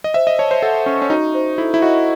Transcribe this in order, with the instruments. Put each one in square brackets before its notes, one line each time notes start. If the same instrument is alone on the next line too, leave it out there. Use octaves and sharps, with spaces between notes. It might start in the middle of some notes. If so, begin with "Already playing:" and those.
[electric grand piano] D#5
[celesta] C5 [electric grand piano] E5
[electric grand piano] D#5
[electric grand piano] C#5 [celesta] A5
[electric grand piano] C5
[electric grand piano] A4 [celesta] F#5
[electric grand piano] C#4 [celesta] C#6
[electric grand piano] C#4
[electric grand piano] D#4 [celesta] F#4
[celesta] C5
[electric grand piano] E4 [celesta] A4
[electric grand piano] E4
[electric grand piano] F#4 [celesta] D#5